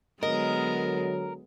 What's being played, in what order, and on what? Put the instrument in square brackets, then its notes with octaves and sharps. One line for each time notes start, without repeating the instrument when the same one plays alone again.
[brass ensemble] D3 F#3 [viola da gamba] G#3 B3 [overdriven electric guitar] A#4 [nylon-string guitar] D#5